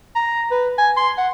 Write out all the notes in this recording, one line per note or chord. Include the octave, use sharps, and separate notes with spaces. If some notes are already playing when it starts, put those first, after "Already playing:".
A#5
B4
G#5
C6
F#5